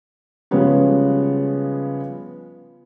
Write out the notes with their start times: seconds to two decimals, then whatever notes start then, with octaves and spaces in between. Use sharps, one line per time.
0.51 C#3 F3 G3 G#3 B3 C#4